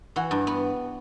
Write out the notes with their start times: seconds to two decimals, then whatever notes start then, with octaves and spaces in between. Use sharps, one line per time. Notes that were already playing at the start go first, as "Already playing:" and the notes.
0.16 E3 F#4 F#5
0.31 G2
0.47 B3